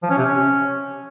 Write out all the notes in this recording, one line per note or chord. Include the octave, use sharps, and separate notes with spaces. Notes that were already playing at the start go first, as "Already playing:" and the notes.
F3
C#4
C3
C#4